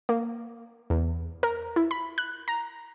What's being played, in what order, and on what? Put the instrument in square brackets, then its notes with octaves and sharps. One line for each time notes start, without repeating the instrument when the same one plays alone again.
[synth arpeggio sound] A#3
E2
A#4
E4
B5
F#6
A#5